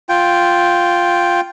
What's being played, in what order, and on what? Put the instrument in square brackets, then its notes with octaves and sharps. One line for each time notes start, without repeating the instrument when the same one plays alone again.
[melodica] F4 G5